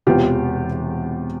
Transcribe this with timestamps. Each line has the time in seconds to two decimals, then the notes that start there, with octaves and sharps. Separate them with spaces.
0.07 E1 E2 C3 F4 G4